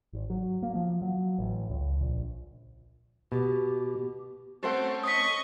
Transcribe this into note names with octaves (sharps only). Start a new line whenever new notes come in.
G#1
F#3
A#3
F3
F#3
A1
C#2
A#1
B2 G4
A3 C4 C#4 A4 C5 F#5
D#5 C#6 D#6 B6